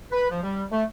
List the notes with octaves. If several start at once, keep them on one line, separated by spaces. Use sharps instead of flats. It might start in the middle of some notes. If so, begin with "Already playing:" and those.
B4
F3
G3
A3